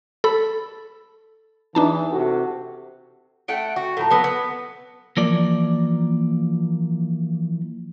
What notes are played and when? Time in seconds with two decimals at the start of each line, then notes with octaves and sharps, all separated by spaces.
0.24 A4 B5
1.75 E2 E3 D4 D#4 A5
2.12 C3 F#4 A4
3.48 A3 F#5 G5
3.76 F#4
3.97 A2 F3 A#5
4.10 F#3 B3 B4
4.24 B3
5.17 E3 F3 A#3 D5